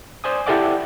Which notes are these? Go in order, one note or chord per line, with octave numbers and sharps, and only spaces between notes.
C5 D5 G#5 D#6
E4 G4 A4 D5 F#5 D6